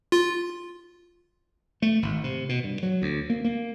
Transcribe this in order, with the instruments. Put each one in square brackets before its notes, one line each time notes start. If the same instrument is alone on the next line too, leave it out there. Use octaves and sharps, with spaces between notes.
[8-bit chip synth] F4
[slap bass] A3
G#1
C3
B2
G2
F#3
D2
A#3
A#3